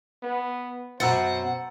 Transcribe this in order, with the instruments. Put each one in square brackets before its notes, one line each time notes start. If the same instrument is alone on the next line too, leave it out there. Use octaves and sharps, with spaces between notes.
[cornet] B3
[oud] F#2 B2 F#3 [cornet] C5 [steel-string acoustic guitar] F#5 [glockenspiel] A#5 E6 A6